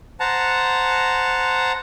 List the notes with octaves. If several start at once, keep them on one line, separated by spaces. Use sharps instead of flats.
C5 F#5 A5 A#5